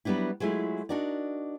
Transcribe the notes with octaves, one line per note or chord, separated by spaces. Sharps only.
F#3 G3 B3 D4 E4
F#3 G#3 A3 E4 F4 G#4
D4 D#4 F#4 A#4 D5